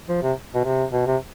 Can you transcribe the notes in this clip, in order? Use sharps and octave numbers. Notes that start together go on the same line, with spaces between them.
F3
C3
B2
C3
B2
C3